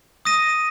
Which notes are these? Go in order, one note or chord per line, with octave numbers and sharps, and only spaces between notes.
D#6 A#6 D#7